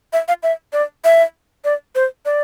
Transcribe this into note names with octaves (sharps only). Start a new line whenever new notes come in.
E5
F5
E5
D5
E5
D5
C5
D5